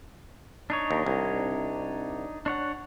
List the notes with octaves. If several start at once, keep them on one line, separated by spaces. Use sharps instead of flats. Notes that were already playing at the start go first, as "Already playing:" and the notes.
D4 D#4 C#5
D#2
C2
D4 C#5 F#5